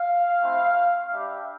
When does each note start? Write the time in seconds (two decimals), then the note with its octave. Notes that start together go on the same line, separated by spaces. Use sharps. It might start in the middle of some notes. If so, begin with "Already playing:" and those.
Already playing: F5
0.40 A3 C4 E4
1.12 G3 D4 G4 E5